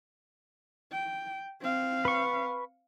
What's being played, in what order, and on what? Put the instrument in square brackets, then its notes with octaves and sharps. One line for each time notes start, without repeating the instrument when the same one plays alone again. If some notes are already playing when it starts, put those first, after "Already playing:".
[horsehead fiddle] G5
C4 F5
[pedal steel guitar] B4 C#6